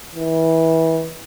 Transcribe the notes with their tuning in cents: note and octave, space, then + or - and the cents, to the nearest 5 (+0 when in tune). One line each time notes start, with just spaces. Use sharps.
E3 -25